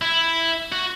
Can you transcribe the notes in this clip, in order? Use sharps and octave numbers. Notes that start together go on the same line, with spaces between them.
E4
F#4